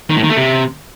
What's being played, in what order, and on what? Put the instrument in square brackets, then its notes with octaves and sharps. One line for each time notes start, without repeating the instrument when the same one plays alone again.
[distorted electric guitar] D#3
A2
D#3
A3
C3